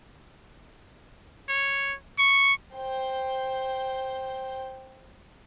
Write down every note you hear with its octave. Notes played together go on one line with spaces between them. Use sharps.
C#5
C#6
C5 G5